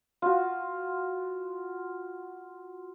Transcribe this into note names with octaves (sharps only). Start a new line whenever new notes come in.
F4 F#4